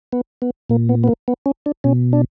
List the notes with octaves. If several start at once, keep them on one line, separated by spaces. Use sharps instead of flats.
B3
B3
A#2 A#3
B3
B3
A#3
B3
C#4
D4
B2 C#4
D4